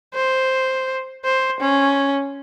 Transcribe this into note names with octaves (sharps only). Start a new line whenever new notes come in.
C5
C5
C#4